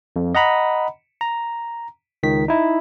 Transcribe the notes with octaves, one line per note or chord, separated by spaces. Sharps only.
F2
D#5 F#5 A#5 B5
A#5
C#2 D#3 B6
D#4 E4